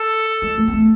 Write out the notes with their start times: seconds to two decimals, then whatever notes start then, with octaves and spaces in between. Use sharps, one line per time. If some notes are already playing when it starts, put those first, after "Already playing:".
Already playing: A4
0.42 G#3
0.58 A3
0.68 B3
0.73 A3